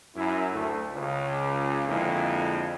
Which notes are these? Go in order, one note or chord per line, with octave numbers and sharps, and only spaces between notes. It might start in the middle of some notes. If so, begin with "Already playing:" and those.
F#2 E4
D2 A3
C#2 C#3
F2 D3 G#3 A#3 E4